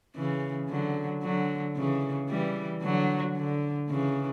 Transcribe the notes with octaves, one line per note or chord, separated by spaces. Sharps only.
C#3 E3
D3 F#3
D3 F#3
C#3 E3
E3 G3
D3 F#3
D3
C#3 E3